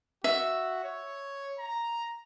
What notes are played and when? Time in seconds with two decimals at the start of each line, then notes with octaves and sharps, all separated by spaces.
0.24 F#4 E5
0.84 C#5
1.59 A#5